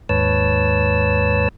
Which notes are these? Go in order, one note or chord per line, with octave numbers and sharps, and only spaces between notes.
D#2 G#2 B4 C#5 A5 E6